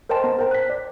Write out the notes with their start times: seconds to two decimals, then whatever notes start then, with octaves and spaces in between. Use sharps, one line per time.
0.09 A#4 C5 D#5 G5 A5 C6
0.24 B3 A#5
0.39 A#4 C5 G5 A#5
0.51 F#6 B6
0.70 D5